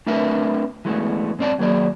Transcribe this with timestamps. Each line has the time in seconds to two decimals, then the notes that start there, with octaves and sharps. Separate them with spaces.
0.06 A3 C4 D4 A#4 B4 E5
0.85 E3 G#3 A3 B3
1.39 G#2 C4 D5 A5
1.58 D#2 F#3 A#3 G#4 D5